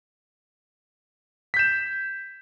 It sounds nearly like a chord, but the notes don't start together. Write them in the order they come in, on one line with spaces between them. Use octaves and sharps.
B6 G6 E7